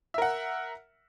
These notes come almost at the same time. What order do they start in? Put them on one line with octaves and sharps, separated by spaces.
E5 A#4 F#5